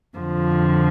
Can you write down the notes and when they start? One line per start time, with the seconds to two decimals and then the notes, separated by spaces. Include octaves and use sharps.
0.17 F2 D3 F3